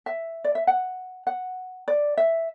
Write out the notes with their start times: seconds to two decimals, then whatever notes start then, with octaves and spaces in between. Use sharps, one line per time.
0.06 E5
0.44 D5
0.55 E5
0.67 F#5
1.27 F#5
1.88 D5
2.18 E5